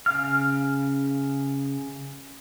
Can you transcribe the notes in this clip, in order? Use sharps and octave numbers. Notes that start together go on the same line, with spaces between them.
C#3 F5 F6